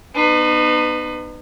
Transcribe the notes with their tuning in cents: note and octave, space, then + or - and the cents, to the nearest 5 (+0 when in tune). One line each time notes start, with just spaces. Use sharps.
B3 -5 D#4 -35 B4 +25